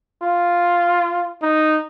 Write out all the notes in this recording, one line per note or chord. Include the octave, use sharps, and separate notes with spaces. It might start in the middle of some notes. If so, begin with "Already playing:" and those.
F4
D#4